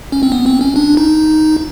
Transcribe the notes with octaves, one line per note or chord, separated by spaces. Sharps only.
C#4
C4
B3
C4
C#4
D4
D#4